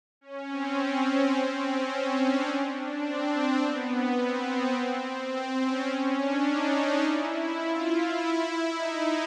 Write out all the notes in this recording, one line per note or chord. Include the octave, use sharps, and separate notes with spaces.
C#4
C4
C#4
C4
C#4
C#4
D4
D4
C4
B3
C4
C4
C#4
C#4
D4
D#4
E4
F4
E4
D#4